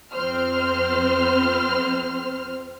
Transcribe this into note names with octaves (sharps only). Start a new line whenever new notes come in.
F2 C4 C5 F6